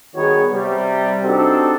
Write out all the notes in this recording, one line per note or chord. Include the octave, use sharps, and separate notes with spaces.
D#3 G3 B3 F#4 G#4 C#5
C3 G3
C4 D4 D#4 F#4 G4 A4